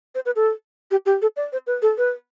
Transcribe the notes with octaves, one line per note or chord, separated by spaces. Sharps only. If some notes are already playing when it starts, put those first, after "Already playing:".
C5
B4
A4
G4
G4
A4
D5
C5
B4
A4
B4